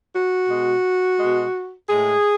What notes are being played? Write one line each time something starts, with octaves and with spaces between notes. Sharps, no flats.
F#4
B2 G#3
B2 G#3
A2 G#3 G#4